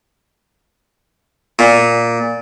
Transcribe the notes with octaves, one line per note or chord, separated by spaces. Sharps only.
A#2